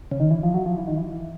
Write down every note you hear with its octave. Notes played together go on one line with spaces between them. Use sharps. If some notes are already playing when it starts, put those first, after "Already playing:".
C#3
D#3
E3
F3
F#3
F3
E3
D#3
E3